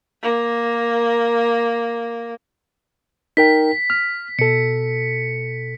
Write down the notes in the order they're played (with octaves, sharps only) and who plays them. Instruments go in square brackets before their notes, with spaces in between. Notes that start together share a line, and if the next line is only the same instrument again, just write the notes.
[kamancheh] A#3 A#4
[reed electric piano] D#4 A#4 G5 [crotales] B6
[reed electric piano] F6
[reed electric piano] B2 A4 [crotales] C#7